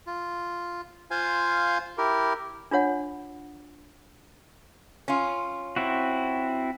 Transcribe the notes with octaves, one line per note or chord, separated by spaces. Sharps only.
F4
F4 C5 F5 G#5
E4 G4 A#4
D4 F4 C#5 F#5
C#4 F4
C4 E4 F#4